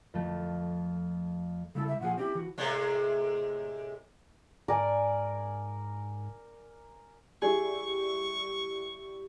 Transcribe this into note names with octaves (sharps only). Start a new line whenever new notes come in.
F2 A3
C#3 G3 E4 A4
E5
A#2 F3 G#4 F#5
C4 D#4 E4 G4
E3 F#4
A2 C3 G#3
G#2 A#4 D5 G#5
G3 E4 G#4 C#6